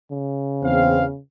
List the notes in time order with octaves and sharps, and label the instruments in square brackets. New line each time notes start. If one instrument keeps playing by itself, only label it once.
[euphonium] C#3
[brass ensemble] E2 C4 F5